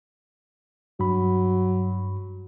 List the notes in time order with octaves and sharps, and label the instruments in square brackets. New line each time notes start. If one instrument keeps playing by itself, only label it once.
[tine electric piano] G2 B5 [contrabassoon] F#3